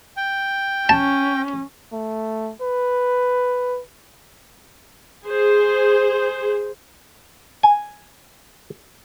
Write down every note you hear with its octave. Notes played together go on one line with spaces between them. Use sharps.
G5
C#4 A5
A3
B4
G#4 C5
G#5